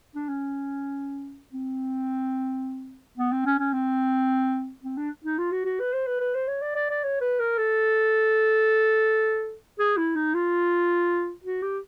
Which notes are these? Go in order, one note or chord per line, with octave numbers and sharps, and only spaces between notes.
D4
C#4
C4
B3
C4
C#4
C#4
C4
C4
D4
D#4
F4
F#4
F#4
B4
C5
B4
B4
C5
C#5
D5
D5
D5
C#5
B4
A#4
A4
G#4
E4
D#4
F4
F#4
G4